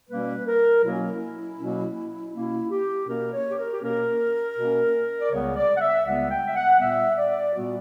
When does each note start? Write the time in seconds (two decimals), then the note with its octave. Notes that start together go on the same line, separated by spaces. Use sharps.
0.09 B2 G3 A#3 C#4 B4
0.47 A#4
0.84 B2 F#3 A#3 C#4 E4
0.94 F#4
1.02 E4
1.59 B2 F#3 A#3 C#4
2.33 B2 A#3 C#4 E4
2.71 G4
3.07 B2 A#3 C#4 A#4
3.32 C#5
3.50 G4
3.57 A#4
3.73 G4
3.82 B2 A#3 C#4 A#4
4.56 B2 A#3 C#4
5.21 D5
5.32 C#2 C#3 G3 B3 C#5
5.56 D5
5.77 F#5
5.81 E5
6.06 C#2 C#3 G3 B3 F#5
6.30 G5
6.47 E5
6.56 F#5
6.80 A#2 G3 B3 E5
7.18 D5
7.54 A#2 G3 B3 F#4